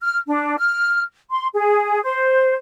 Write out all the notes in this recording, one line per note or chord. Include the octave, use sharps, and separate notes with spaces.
F6
D4
F6
C6
G#4
C5